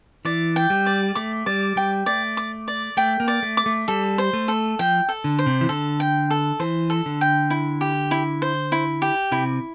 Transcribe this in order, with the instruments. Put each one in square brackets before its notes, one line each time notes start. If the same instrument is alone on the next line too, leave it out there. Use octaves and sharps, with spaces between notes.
[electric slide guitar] E3 [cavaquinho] D5
[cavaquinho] G5
[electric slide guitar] G3
[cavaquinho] D5
[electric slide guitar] A3 [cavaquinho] D6
[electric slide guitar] G3 [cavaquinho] D5
[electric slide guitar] G3 [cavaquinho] G5
[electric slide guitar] A3 [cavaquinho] D5
[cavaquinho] D6
D5
[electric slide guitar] A3 [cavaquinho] G5
[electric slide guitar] A#3
[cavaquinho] D5
[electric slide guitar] A3
[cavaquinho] D6
[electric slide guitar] A3
[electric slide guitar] G3 [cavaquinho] A4
[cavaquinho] C5
[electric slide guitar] A3
[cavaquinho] A4
[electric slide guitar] F3 [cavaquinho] G5
[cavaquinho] A4
[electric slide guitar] D3
[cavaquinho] C5
[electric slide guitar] C3
E3
[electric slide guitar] D3 [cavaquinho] A4
[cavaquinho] G5
A4
[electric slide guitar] E3 [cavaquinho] C5
[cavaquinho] A4
[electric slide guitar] D3
[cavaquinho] G5
E4
G4
E4
C5
E4
G4
[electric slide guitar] C3 [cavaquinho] E4